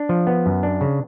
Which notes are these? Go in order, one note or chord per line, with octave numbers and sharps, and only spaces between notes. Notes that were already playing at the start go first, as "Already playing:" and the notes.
Already playing: D4
F3
B3
F#2
D4
C#3